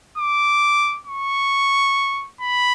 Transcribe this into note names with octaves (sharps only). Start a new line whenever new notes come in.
D6
C#6
B5